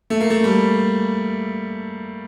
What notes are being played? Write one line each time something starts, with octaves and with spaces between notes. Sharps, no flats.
A3
A#3
A3
G3